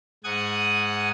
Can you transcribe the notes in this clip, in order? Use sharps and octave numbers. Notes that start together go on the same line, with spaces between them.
G#2 F#5 G#5 D#6 G#6